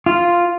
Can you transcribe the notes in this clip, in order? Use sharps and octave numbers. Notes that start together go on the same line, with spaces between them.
F4